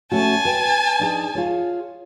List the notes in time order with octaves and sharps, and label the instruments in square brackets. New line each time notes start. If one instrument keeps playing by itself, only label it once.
[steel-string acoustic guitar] A3 C#4 F#4 [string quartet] G#5 A5
[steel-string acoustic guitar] B4 G5
D4 D#4 G#4
F4 G#4 C#5